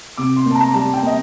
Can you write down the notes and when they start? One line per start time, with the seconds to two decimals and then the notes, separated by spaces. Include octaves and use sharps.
0.17 C3 D6
0.36 C6
0.45 A#3
0.51 A5
0.55 A#5
0.68 A#5
0.74 G3 A5
0.88 A5
0.93 G5
1.02 A#3 D#5